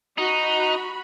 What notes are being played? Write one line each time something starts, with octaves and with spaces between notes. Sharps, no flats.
D#4 F#4 B5